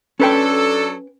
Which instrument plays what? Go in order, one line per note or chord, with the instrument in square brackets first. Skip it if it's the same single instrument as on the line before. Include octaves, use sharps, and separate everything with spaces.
[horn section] F#3 D4 A4 [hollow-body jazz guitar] C#4 B4 G5